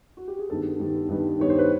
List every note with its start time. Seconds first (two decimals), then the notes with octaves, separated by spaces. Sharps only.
0.17 F#4
0.28 G4
0.39 G#4
0.50 G2 D#3 G3 B3 A4
0.79 G2 D#3 G3 B3
1.08 G2 D#3 G3 B3
1.38 G2 D#3 G3 B3 C#5
1.50 C5
1.58 B4